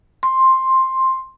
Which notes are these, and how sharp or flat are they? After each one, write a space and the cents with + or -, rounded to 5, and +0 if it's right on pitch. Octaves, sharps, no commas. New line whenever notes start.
C6 +10